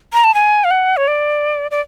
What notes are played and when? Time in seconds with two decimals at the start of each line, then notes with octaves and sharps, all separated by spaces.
0.13 A#5
0.24 A5
0.34 G#5
0.64 F5
0.71 F#5
0.97 C#5
1.08 D5
1.71 D5